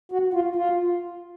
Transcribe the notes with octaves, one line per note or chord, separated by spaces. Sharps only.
F#4
F4
F4